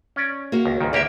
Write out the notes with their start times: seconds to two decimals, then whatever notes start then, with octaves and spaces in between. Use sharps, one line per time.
0.16 C#4 D5
0.52 A#3 F#4
0.65 C#2
0.81 C#2 G#2 D#3
0.93 D2 A#3 G4 D5 E5